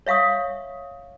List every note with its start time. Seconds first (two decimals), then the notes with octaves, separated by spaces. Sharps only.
0.07 C#5 E5 F5 C#6 D#6